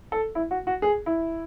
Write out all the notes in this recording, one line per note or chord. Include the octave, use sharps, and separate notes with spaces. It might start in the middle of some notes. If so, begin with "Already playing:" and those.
A4
E4
F#4
F#4
G#4
E4